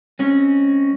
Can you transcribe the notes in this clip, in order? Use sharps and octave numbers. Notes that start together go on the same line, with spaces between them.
G#3 C4 C#4